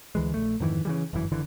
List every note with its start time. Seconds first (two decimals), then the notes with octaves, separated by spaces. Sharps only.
0.15 D2 E3 G#3
0.34 A#1 A3
0.60 F2 G#2 D#3 E3
0.85 C#3 E3 G3
1.13 G1 F#2 E3
1.32 F#1 D3 E3